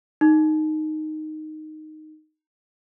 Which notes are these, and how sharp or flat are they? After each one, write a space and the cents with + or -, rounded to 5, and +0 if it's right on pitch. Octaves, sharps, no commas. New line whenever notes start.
D#4 -5